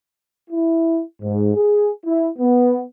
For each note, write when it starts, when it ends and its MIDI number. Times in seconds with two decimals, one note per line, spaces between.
0.50 1.01 64
1.21 1.53 44
1.54 1.89 68
2.06 2.28 64
2.38 2.81 59